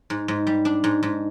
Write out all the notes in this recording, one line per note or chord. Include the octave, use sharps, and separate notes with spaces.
G#2
G#2
G3
D4
G#2
G#2